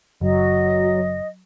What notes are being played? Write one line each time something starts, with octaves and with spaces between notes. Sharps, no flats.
F#1 F#3 D#5